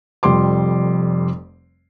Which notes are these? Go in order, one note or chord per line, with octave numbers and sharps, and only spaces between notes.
F1 F2 G3 C6 D6